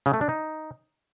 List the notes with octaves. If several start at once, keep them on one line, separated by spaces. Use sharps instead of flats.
C#3
A3
D4
D#4